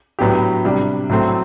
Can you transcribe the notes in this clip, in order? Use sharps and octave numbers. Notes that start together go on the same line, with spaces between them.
A2 F#3 B3 D4 G4
C3 G3 D4
A2 F#3 A3 C4